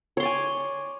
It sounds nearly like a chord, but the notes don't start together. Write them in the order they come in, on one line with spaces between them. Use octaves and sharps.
C#5 C6 D5 G#5